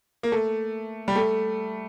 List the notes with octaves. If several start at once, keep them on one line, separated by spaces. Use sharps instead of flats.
A#3
A3
G3
A3